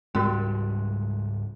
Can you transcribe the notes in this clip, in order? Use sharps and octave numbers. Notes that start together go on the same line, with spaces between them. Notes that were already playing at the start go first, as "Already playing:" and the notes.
C#2 G#2 G3 G#3 C#4 F#4 A#4